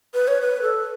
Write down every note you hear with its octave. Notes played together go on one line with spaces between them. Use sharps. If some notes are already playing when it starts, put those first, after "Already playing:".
B4
C#5
B4
A4